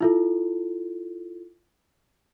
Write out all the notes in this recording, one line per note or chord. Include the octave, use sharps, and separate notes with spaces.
E4 F4 A4